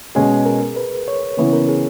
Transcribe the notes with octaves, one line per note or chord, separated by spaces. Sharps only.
B2 G#3 C#4 G#4
A#4
B4
C#5
C#3 E3 B3 C#5
A#4
G#4